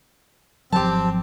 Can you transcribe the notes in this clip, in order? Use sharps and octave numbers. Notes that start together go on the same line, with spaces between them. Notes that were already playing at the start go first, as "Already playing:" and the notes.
G#1 F3 F#3 C4 G4 A5